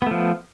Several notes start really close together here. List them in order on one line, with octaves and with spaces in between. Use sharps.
B3 A3 F3